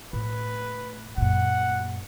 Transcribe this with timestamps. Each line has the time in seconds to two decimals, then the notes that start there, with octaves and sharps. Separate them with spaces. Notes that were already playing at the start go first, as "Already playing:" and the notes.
0.13 A2 B4
1.17 F#2 A#2 F#5